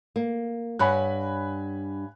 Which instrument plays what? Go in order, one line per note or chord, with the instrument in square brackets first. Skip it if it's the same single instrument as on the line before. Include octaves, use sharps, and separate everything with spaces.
[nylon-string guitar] A#3
[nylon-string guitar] G2 C#5 F#5 [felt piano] G#5 B5 F#6